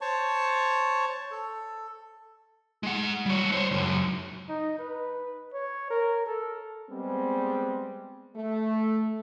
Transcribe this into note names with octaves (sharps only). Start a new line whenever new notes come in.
C5 C#5 A5 C#6
A4
G#3 F#5
G3 C#5
C5 C#5
C#2 F#2
D#4
B4
C#5
A#4
A4
G3 G#3 B3 C4
A3